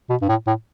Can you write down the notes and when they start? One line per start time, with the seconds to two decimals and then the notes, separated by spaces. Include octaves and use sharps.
0.10 B2
0.22 G2
0.29 A2
0.47 A2